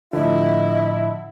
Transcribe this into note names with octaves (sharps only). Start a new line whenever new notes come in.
A2 D3 F3 E4 D#5